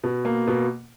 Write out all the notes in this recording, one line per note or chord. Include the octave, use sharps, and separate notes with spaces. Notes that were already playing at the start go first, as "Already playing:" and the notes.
B2
A#3
B2